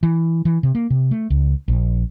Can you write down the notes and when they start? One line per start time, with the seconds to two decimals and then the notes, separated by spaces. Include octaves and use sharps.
0.03 E3
0.45 E3
0.63 C3
0.75 A#3
0.90 C3
1.11 A3
1.30 C#2
1.68 A#1